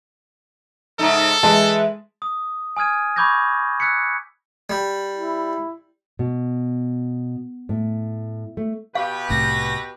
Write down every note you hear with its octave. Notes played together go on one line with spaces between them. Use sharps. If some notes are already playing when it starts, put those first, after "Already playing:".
G#2 C#3 D#4 A4
E3 G#3 B4 A5
D#6
G#5 D#6 F6 G#6 D#7
B5 C#6 D6 G6 G#6 A#6
E6 F#6 G#6 B6 C#7
G3
E4
B2
A2
A3
B2 G4 B4 F5
C2 A2 A#6